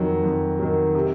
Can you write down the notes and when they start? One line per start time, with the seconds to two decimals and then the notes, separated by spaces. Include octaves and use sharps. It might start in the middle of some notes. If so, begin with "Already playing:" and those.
Already playing: F2 D#3 F#3
0.24 F2
0.59 D#3 F#3
0.95 C3